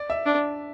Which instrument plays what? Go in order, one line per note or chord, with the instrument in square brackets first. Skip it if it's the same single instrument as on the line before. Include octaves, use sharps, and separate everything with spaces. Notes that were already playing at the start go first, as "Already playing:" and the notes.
Already playing: [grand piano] D5
E5
[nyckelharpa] D4